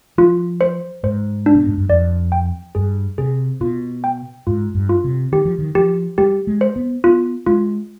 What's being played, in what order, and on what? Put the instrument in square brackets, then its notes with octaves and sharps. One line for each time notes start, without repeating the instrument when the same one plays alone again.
[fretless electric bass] F3 [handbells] F4
[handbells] C5
[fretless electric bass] G#2 [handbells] C5
[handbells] D4
[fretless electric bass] B2
G#2
G2
[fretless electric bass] F2 [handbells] D5
[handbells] G5
[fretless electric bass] G2 [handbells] G#4
[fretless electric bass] C3 [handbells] G#4
[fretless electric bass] B2 [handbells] F4
[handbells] G5
[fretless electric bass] G#2 [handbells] F4
[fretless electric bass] G2
[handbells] F4
[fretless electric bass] C3
[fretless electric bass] D#3 [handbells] G4
[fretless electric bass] F3
D#3
[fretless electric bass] F3 [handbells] G4
[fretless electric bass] G3 [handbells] G4
[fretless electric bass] G#3
[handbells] C5
[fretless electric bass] B3
[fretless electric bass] B3 [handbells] F4
[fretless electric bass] G#3 [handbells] F4